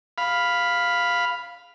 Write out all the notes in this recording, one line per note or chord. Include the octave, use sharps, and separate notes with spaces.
F5 B5